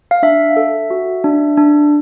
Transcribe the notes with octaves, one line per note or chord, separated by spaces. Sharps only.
F5
D4 E5
A4
F#4
D4
D4